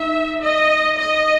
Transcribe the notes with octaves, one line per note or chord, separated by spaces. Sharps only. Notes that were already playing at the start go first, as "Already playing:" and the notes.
Already playing: D#4 E5
D#5
D#5